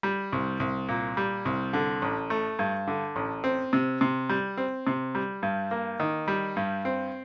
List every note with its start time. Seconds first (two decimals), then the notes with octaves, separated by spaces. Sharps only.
0.03 G3
0.32 C2
0.60 C2
0.89 A#2
1.17 G3
1.45 C2
1.73 D3
2.02 A1
2.30 A3
2.59 G2
2.88 D3
3.16 A1
3.44 C4
3.73 C3
4.01 C3
4.29 G3
4.58 C4
4.87 C3
5.15 G3
5.43 G2
5.71 A#3
6.00 D#3
6.28 G3
6.57 G2
6.85 C4